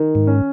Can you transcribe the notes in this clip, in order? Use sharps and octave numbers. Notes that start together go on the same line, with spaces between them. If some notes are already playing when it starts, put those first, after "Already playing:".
Already playing: D#3
G#2
C#4